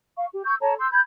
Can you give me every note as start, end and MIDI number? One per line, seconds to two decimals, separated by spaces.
0.16 0.26 77
0.16 0.26 85
0.32 0.43 67
0.45 0.55 85
0.45 0.55 88
0.45 0.55 91
0.61 0.74 69
0.61 0.74 73
0.61 0.74 81
0.61 0.74 82
0.79 0.89 84
0.79 0.89 88
0.79 0.89 91
0.92 1.00 83
0.92 1.00 91
0.92 1.00 92